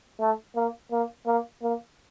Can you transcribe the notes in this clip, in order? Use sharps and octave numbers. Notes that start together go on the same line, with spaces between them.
A3
A#3
A#3
A#3
A#3